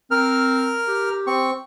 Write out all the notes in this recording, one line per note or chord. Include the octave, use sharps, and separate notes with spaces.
C4 A#4 F6
G4
C4 C#6